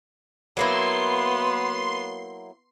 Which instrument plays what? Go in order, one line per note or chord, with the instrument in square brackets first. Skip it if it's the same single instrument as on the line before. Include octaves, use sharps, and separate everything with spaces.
[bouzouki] F#3 A#3 E4 [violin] B3 [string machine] C6 C7